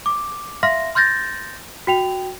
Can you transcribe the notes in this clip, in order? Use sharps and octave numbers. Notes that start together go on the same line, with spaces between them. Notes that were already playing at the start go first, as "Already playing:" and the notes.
D6
E5 F5 C6 F6 A#6
C6 F6 G6 A6 A#6
F#4 G5 F7